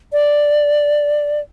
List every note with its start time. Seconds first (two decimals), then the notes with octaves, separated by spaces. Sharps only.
0.13 D5